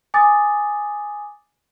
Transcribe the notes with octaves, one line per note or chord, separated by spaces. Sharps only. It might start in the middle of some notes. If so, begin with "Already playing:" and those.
G#5 D6 D#6 A6